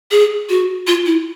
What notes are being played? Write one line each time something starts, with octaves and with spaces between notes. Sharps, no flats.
G#4
F#4
F4
E4